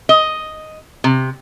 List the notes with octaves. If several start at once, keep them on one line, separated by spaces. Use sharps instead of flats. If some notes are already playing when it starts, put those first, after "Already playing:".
D#5
C3